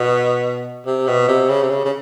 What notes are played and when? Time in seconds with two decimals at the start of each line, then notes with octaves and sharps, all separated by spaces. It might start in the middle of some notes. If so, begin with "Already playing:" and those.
Already playing: B2
0.86 C3
1.07 B2
1.28 C3
1.49 C#3
1.63 C3
1.70 C#3
1.85 C#3